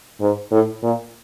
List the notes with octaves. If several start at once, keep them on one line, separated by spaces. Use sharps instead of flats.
G#2
A2
A#2